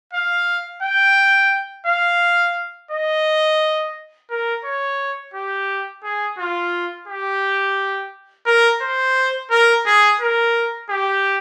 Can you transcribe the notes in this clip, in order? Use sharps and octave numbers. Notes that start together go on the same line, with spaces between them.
F5
G5
F5
D#5
A#4
C#5
G4
G#4
F4
G4
A#4
C5
A#4
G#4
A#4
G4